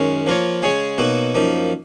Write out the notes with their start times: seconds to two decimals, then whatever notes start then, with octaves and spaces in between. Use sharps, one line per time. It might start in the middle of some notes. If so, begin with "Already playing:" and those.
Already playing: F#2 D#3 G#3 C#4
0.27 F3 A#3 F4 A#4 C#5
0.62 C#3 G#3 C#4 G#4 C#5
0.98 B2 F#3 A#3 D#4 F#4
1.34 F#2 F3 A#3 D#4